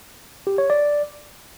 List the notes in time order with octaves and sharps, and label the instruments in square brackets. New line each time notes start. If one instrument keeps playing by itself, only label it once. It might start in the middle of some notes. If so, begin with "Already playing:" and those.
[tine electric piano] G4
C#5
D5